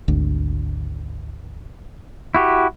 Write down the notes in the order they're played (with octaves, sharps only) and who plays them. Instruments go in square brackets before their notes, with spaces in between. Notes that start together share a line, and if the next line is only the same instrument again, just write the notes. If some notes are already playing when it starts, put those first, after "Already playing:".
[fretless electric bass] G#1 D2
[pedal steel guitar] E4 F#4 G4